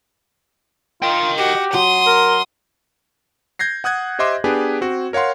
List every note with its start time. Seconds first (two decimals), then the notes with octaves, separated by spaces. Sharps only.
1.02 F4 D#5 G5
1.38 F#4 G4
1.74 F#3 C6 D#6
2.07 A#4
3.59 G6 G#6 A#6 C7
3.84 F#5 D#6 F#6 G#6
4.19 G4 C5 D#5 E5 C6 D6
4.44 B3 D4 G4 G#4 B4 G#5
4.81 C4 F#4
5.13 A#4 C#5 F5 F#5 C6